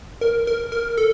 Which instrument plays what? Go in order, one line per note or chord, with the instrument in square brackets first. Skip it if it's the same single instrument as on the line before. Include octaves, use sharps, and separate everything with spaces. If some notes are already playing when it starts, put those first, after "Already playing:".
[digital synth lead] A#4
A#4
A#4
A4